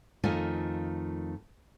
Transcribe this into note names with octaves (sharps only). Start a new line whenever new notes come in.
F2 D#3 A3 F4 D#5 G#5